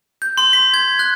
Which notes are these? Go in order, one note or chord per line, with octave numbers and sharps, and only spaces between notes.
G6
C6
B6
G#6
F#6